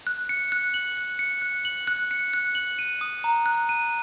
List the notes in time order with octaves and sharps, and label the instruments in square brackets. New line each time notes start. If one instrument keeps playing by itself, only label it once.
[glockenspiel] F#6
C#7
F#6
F#7
F#6
C#7
F#6
F#7
F#6
C#7
F#6
F#7
D#7
D#6
A#5
F#6
D#7